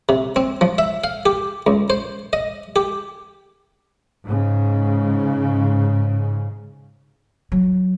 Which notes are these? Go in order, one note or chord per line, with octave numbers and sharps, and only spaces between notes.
C3
C4
F3
E5
F5
G4
C#2
C5
D#5
G4
G#2 C#3
F#3